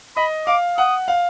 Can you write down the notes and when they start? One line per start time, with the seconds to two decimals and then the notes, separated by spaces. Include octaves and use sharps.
0.16 D#5 B5
0.47 F5 D6
0.77 F#5 D#6
1.08 F5